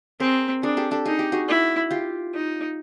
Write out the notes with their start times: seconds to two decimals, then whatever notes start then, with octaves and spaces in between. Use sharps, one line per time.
0.20 C4 G#4 A#4
0.63 D4 G#4 A#4
0.77 G4 A4
0.91 G4 A4
1.05 D#4 G#4
1.19 G4
1.32 F#4 G#4
1.48 E4
1.91 F4 G4
2.34 D#4